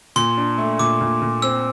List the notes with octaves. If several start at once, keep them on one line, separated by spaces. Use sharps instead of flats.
A#2 C6
D4
A3
A#2 D6
A#2
A#2
C4 E6